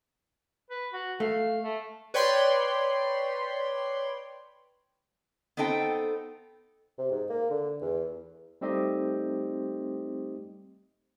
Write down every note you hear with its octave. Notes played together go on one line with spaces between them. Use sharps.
B4
F#4
A3 F5
A3
B4 C#5 D5 G5 B5 C6
B3 C4 D#4 A4 G5
C3
G#2
A#3
D3
E2
G3 A3 C4 D#4 G4 D#5